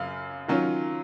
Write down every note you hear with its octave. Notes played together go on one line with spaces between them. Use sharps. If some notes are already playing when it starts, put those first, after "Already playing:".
Already playing: F#2 C#3 F5
D#3 F#3 C#4 F4